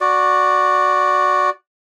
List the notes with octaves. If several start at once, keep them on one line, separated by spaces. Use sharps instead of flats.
F#4 D5